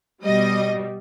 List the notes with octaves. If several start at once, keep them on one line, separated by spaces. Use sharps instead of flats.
B2 G3 D#5